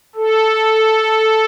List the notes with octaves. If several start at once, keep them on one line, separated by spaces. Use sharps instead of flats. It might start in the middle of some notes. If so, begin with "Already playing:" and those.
A4